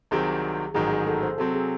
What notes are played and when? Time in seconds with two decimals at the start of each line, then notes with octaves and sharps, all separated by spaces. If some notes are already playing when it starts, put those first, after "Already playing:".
0.11 C2 C3 D#3 F#3 C4 G#4
0.74 A1 G#2 D#3 F#3 G#4
0.91 G#4
1.07 A4
1.23 C5
1.38 C3 F#3 C4 A4
1.54 G#4